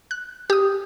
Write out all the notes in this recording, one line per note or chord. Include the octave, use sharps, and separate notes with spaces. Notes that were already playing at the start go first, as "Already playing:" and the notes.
F#6
G4 D#6